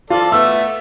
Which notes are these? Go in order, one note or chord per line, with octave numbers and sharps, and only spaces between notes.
F3 F4 A4 D5
A3 B3 E5 E6